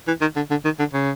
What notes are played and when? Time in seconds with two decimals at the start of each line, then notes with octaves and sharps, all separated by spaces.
0.08 E3
0.21 D#3
0.36 D3
0.51 D3
0.65 D#3
0.79 D3
0.93 C#3